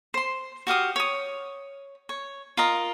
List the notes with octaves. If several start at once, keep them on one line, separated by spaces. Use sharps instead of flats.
C5 C6
F#4 G4 F5 D#6
C#5 D#6
C#5
F4 A#4 D#5